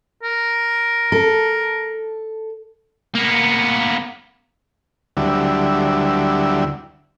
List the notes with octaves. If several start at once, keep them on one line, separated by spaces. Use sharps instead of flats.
A#4
A4
A#3 B3
D2 D3 F#3 G3 E4